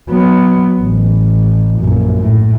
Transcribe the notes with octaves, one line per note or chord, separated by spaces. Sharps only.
F#3 B3
A1
A#1 F#2
A2